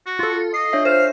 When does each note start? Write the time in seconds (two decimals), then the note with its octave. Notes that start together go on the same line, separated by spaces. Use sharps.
0.06 F#4
0.19 F4 A4
0.54 D#5 C7
0.73 D4 C#5 E5
0.85 C5 F5